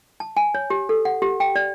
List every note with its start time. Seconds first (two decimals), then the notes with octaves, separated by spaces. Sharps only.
0.20 A5
0.37 G#5
0.55 C#5
0.70 G4
0.89 A4
1.05 F#5
1.22 G4
1.40 G5
1.56 D5